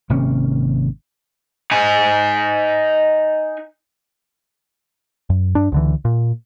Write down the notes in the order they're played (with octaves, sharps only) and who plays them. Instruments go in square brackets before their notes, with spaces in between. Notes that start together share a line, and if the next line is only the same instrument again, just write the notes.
[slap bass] G#1 C3 A#3 C#4
[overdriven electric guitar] D#4 G#5
[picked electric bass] F#2
G2 D4
C#2 D3 E3
A#2